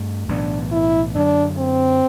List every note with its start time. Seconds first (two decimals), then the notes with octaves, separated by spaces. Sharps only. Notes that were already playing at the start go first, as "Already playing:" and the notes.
Already playing: G2 A3 C4
0.28 B1 A2 E3 B3 D4
0.72 E4
1.15 F#2 D3 F#3 D4
1.58 C4